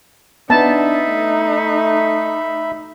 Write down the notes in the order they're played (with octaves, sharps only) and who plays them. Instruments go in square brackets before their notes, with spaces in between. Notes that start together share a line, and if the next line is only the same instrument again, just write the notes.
[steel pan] B3 A5 [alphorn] D4 [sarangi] D#4 [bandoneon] E5 B5
[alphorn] A3